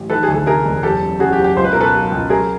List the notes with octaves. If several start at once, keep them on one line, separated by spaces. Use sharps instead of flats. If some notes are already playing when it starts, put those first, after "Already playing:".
Already playing: A1
D#3 A4 B4
G#4
D2
A4
C3 G#4 A#4
E1
F#1 G4 A4
F#2
C#3 F#4 G#4
G4
F#1
G4
C#2 C5
B4
B2 A#4
A4 B4
F#3
C#2
F#3 G#4 A#4